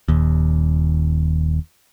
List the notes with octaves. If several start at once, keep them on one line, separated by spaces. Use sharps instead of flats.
D#1 D#2